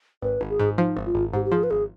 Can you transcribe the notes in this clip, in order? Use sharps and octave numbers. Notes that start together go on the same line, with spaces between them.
G#1 B4
G#1
G#4
G#2
F3 D#4
G#1
F4
G#1
G#2 G4
G4
F3 G#4
B4
G#1 G#4